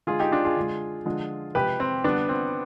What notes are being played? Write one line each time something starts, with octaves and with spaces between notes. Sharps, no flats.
D3 G#3 F4 G#4
D#4 G4
D4 F4
F4 G#4
D3 G#3
D3 F3 G#3
C3 F3 G#3 G4 B4
C4
D3 G3 B3 D4
C4